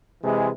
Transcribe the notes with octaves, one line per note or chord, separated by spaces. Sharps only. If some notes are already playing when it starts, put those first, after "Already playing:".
C3 E3 G#3